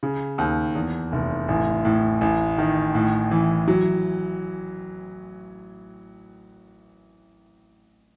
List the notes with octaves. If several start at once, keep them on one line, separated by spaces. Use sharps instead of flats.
C#3
D#2
E2
F1
A1
A2
A1
D#3
A2
E3
F#3